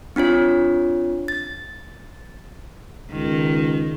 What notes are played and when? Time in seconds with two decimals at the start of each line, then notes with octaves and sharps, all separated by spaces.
0.16 C4 D4 F4 C#5
1.28 A6
3.12 C#2 D#3